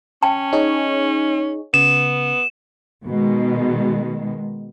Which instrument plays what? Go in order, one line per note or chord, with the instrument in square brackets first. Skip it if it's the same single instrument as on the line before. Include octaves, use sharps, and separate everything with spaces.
[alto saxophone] C#4 [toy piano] G5 A5
[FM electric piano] D#4 G#4 C#5
[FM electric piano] C#3 [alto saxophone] B3 [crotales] E7
[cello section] B2 D#3 G#3